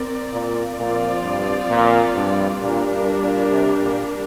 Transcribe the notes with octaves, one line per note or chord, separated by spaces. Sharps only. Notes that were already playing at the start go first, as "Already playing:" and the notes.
Already playing: C4 A#4 D5
A#2
A#2 F3 C4 F4 D5
G2
A#2
G2
A#2 G3 D4 A#4
G2
A#2
C3
A#2